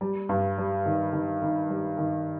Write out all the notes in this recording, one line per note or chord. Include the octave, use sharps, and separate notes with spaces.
G3
G2
G3
D#3
D#3
D#3
G3
D#3